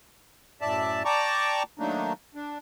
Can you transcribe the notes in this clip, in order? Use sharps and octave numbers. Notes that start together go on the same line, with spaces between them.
F#2 A2 D5 E5 A5
D5 G5 A5 A#5 C#6 D6
D#3 F#3 A3 A#3 D4 D#4
D4